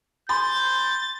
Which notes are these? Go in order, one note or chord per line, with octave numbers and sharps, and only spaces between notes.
G#5 B5 C6 G6 A6